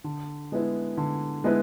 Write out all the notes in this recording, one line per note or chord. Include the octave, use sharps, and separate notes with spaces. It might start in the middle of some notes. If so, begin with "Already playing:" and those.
D3
G#3 B3 E4 B4
D3
G#3 B3 E4 B4